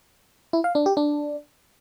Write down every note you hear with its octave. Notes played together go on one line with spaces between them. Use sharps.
E4
F5
D4
G4
D4